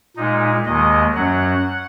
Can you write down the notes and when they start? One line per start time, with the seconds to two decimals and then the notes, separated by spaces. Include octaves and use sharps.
0.17 A#2 G#3 D#4
0.66 D#2 D#3 G#3 D#5
1.14 F#2 F#3 F#5